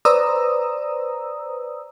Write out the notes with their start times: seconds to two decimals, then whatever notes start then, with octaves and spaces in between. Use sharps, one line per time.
0.05 B4 C5 D5 A#5 D#6 E6